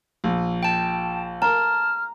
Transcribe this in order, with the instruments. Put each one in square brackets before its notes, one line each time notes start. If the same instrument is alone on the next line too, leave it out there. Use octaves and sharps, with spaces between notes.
[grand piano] A#1
[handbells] G5 A5
[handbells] A5 [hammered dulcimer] A#5 [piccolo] F6